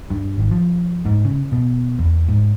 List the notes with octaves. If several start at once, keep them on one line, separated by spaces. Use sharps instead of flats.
G2
G#1
F3
G#2
C#3
B2
E2
G#2